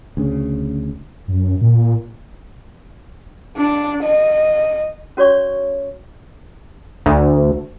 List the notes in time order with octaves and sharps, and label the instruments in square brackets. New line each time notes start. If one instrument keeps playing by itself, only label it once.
[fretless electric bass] D2 C#3
[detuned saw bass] F#2
A#2
[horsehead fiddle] D4
D#5
[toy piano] C#4 F#4 C#5 D5 C#6
[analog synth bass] D2